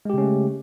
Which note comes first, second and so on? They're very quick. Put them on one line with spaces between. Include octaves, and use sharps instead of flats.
G#3 G4 C#3 C#4 A3